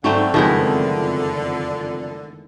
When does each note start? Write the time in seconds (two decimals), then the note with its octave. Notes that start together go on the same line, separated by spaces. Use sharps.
0.04 G#2 D3 F#3 A3 C4
0.34 F#1 F2 D#3 F3 G#3 A3 B3 E4